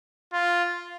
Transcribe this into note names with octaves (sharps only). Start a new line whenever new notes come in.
F4